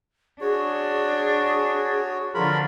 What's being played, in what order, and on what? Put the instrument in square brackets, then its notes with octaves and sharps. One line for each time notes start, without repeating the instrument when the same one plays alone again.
[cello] D4 [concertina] F#4 C#5 [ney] G#4
[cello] D3 F3 [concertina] F4 A#4 B5